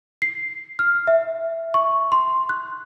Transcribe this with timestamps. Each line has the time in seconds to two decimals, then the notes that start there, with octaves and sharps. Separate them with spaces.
0.22 C7
0.79 F6
1.07 E5
1.74 C#6
2.12 C6
2.49 F#6